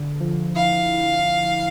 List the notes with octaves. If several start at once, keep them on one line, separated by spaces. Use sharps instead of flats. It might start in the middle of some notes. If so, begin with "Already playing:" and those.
Already playing: D3
F3
E4 F5